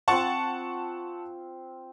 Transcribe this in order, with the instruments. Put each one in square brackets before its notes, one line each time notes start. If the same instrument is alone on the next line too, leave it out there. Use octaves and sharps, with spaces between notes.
[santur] C4 F4 C5 [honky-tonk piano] F#5 A5 C#6